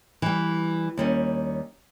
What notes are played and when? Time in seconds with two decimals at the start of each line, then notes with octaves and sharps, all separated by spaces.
0.22 E3 G3
0.97 D#2 G3 C#4